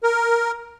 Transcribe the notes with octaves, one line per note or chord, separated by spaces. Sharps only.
A#4